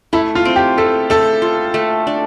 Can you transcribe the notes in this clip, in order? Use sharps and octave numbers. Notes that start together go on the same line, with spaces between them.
A3 E4
F4
C4
G4
A3 A4
A3 A4
F4
A3
D4